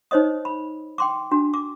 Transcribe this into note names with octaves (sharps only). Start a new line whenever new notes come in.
D#4 C5 C#5 D#5 D#6
B5
G5 C6 D6
D4 F#4
D6